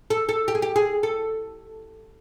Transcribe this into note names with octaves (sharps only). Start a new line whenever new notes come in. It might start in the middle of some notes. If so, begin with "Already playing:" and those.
A4
A4
G4
G#4
G4
G#4
A4